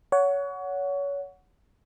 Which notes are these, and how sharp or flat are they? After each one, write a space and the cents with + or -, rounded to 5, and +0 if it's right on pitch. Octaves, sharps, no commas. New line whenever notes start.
C#5 +25 F#5 -5